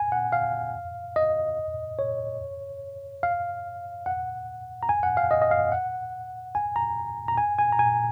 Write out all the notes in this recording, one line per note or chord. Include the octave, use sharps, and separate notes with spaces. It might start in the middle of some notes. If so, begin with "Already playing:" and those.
Already playing: G#5
F#5
F5
D#5
C#5
F5
F#5
A#5
G#5
F#5
F5
D#5
D#5
F5
F#5
G#5
A#5
A#5
G#5
G#5
A#5
G#5